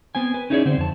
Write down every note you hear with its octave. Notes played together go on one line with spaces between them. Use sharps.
B3 C4 G#5
B4
C#4 D#4 E4 G#4 C#5 D5
D3 C4 C5
F2 A5